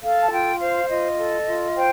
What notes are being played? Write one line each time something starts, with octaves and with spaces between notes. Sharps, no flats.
A4 F5
A5
F4 G5
C5 F5
F4 D#5
A4
F4
C5 G5